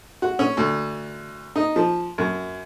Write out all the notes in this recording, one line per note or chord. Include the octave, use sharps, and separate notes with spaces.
F#4
C#4
D2
D#4
F3
F#2